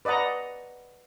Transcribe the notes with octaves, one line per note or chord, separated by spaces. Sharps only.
B4 D5 D#5 F#5 A#5